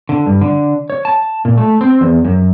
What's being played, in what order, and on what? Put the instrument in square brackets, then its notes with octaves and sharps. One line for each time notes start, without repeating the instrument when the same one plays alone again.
[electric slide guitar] D3
G2
D3
C#5
A5
A#2
A3
C4
E2
F#2